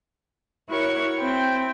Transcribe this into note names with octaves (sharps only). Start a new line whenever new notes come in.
E4 F#4 A#4 C#5 C#6
C4 E4 G5